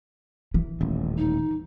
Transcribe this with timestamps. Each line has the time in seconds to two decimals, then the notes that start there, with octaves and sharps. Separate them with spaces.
0.54 E3
0.81 D#1 A1
1.18 D#4